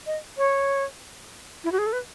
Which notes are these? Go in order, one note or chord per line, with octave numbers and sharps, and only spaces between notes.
D#5
C#5
E4
F#4
G#4
A4
B4